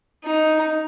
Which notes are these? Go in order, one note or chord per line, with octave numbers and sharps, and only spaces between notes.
D#4